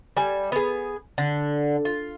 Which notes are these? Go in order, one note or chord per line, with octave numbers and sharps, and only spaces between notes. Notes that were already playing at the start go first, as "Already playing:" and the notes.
G3 G#5
B3 G#4
D3
F4